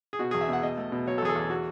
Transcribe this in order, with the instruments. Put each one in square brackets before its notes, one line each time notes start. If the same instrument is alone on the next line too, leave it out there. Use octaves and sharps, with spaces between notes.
[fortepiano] G#4
B2 F#4
E2 G#4
E5
B2 F#5
B2 D#5
A3
B2
F#3 C#5
A4
E2 G#4
A4
E2 G#4
F#4